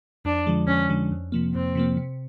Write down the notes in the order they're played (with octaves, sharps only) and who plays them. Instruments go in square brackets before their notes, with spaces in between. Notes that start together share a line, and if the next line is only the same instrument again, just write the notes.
[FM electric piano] F2 [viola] D4
[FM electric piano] D3 F3 G#3
[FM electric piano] F2 [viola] C#4
[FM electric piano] D3 F3 G#3
F2
C3 F3 A#3
[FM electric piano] F2 [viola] C4
[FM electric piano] C3 F3 A#3
C3